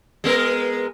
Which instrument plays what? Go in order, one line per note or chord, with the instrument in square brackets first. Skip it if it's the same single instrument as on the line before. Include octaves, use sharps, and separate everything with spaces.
[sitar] G#3 B3 A#4